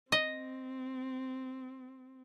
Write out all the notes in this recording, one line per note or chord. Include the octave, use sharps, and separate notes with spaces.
C4 D#5